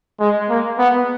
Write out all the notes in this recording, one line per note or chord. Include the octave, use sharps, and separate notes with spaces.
G#3
A#3
B3